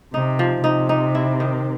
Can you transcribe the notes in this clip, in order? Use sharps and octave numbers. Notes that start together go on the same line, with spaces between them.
C3 D#4
F3
C3 D#4
D#4
E4
D#3